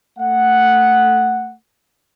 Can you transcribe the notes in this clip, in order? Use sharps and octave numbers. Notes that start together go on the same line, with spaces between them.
A3 F#5